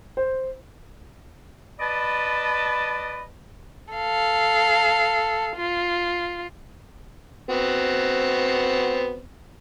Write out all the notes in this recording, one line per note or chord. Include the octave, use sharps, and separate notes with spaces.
C5
B4 D5 D#5 A5 B5
A4 F5
F4
B3 C4 F#4